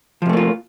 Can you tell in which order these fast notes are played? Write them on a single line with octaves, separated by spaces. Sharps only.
F3 C3 A3 A#3 F4